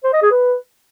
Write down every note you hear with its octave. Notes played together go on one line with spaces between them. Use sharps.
C5
D#5
G#4
B4